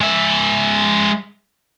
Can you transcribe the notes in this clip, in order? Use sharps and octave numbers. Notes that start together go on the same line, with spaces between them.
G#3 E5